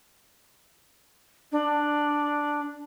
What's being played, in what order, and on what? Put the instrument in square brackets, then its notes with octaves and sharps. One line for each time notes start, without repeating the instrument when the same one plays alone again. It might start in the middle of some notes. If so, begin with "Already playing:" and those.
[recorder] D4